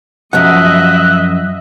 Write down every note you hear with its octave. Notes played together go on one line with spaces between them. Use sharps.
F#2 F3 D#5 E5 F#5 F#6